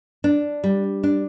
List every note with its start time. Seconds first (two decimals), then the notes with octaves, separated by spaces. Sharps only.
0.24 D4
0.64 G3
1.03 D4